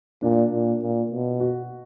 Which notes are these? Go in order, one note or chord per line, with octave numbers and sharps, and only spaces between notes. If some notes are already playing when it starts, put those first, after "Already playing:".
A#2 D4
A#2
A#2
B2
F#4